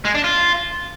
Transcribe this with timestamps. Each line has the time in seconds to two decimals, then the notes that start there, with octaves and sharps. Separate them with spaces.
0.05 G#3
0.14 D4
0.24 F4